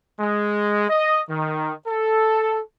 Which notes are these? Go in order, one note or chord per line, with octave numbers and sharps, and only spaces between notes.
G#3
D#5
D#3
A4